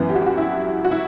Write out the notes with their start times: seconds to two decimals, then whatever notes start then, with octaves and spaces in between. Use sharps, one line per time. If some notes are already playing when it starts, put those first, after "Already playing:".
Already playing: F#2 E3 B3
0.09 G4
0.15 F#4
0.22 G4
0.26 F#4
0.37 E4
0.85 F#4
0.91 E4